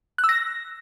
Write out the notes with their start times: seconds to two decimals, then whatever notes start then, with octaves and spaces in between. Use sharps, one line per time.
0.18 F#6
0.24 E6
0.29 A#6